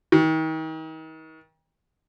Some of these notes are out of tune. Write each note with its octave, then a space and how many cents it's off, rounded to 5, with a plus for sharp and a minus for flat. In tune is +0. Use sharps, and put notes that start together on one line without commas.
D#3 +40